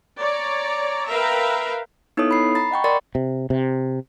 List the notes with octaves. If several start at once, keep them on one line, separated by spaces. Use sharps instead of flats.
C#5 D5 A#5
A#4 B4 E5 F5 G5 A#5
B3 D#4 E4 A4 C#5 D#6
B5 C7
A#5 B5 A6
D#5 F#5 G5 C#6
A#4 D5 B5 C6 A6 C#7
C3
C3